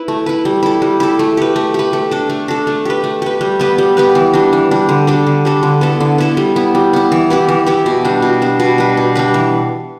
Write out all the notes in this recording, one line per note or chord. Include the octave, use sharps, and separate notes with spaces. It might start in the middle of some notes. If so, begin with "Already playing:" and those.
Already playing: E4 B4
A3
E4 B4
G3
E4 A4
G3
E4 A4
A3
G4 B4
A3
G4 B4
A3
D4 A4
A3
D4 A4
A3
G4 B4
A3
G4 B4
G3
B3 G4 B4
G3
B3 G4 B4
E3
G3 D4
E3
G3 D4
D3
G3 D4 A4
D3
G3 D4 A4
D3
B3 E4 A4
D3
B3 E4 A4
G3
B3 E4
G3
B3 E4
E3
B3 E4 G4
E3
B3 E4 G4
B2
G3 D4
B2
G3 D4
B2
G3 D4 B4
B2
G3 D4 B4
E3